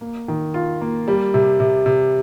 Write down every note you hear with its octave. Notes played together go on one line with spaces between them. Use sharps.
A#3
D#3
F4
A#3
G3
C3
C3
C3